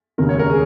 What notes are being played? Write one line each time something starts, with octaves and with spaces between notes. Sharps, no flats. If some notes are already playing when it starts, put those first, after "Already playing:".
D#2 C#3 G#3 A#4
C#5
A#4
G#4